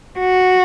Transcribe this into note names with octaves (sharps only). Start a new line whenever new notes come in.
F#4